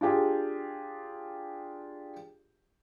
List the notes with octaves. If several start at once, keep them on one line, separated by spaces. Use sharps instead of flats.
D4 F4 G4 G#4